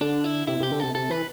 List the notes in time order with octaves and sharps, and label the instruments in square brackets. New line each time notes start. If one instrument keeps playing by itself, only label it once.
[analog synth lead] D3 [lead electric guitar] D4
[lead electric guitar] E4
[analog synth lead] C3 [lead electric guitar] E4
[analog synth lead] C3 [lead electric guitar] G4
[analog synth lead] D3
[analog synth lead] C3 [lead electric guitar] A4
[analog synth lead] C3 [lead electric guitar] A4
[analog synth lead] E3 [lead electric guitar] B4